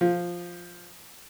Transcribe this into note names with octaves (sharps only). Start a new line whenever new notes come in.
F3